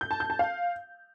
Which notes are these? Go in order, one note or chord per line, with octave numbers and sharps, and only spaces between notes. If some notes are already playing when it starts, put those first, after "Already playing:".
G6
A5
G6
A5
F5